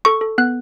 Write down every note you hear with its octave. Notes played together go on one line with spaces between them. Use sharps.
A4 C#6
A4
B3 F#6